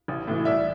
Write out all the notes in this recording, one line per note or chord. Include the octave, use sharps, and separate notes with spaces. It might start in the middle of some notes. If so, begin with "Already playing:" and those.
A1
A2 E3
C2 D5 E5